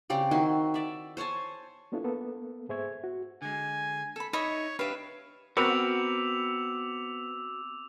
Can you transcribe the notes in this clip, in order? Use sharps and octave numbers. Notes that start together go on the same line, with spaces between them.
C#3 C4 G4 D5
D#3 E4 F#4 C6
D5 E5
C5 C#5 G#5 A5
A#3 B3 D4 E4 F4 A4
A#3 B3 A4
G#2 G#4 C5 E5 C#6 G#6
F#4
D3 G#3 G#5
A4 B5
D#4 C#5 D#5 E5 B5
D4 G4 B4 C#5 E5 F5
B3 C4 F#4 A#4 B5 D6 E6 F7